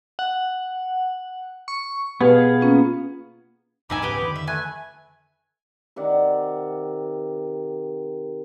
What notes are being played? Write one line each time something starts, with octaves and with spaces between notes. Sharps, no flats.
F#5
C#6
B2 B3 G4 G#4 B4 F5
A#3 C#4 F4
A#1 F2 A#2 D#4 E5 G#5 B5 D6
C#2 G#2 C#3 B3 G4 B4
F2 D3 D#3
E5
A3 B4 G#5
C3 D#3 D5 F#5